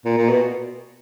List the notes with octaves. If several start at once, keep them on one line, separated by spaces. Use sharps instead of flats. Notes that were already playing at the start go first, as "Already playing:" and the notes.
A#2
A#2
B2